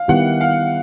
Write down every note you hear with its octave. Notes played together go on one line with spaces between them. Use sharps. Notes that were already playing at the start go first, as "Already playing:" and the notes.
Already playing: F5
D#3 G3 B3 E4 G4 F#5
F5